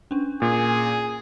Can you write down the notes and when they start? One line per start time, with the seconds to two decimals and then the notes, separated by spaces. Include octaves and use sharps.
0.11 C#4 D4
0.42 A#2 G#4